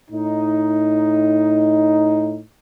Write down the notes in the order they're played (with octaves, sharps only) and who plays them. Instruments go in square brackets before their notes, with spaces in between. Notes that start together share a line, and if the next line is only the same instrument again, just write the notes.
[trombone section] A2 D#4